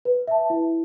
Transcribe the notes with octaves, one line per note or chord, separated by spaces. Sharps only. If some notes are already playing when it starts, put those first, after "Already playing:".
B4
E5 A5
E4